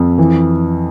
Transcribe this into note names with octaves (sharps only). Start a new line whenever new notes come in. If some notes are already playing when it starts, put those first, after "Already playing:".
Already playing: F2
E3